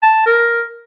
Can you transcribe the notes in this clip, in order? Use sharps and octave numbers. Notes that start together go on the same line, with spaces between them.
A5
A#4